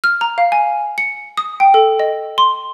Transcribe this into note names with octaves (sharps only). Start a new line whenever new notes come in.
F6
A#5
F5
G#5
C#7
D#6
G5
A4
D#5
C6